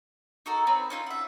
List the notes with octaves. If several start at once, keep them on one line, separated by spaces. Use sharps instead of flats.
D#4 F#4 A4 A#4
C4 B4 C#5
C#4 D#4 F4 G6
E5 F#5